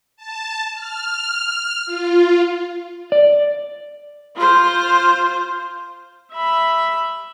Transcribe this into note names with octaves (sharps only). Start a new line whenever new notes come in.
A5
F6
F4
D5
F4 C5
E5 B5